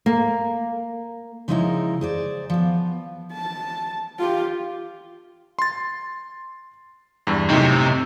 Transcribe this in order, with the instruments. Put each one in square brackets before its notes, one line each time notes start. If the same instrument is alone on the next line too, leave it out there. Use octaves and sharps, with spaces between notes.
[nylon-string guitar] A#3
[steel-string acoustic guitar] C#3 F3 G#3 D#4 E4 A#4
G#4 C5 D5
F3 B3
[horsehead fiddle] A5
F4 G4
[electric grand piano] C6 A6
E2 G2
[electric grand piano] F#2 A2 D#4 [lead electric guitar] C3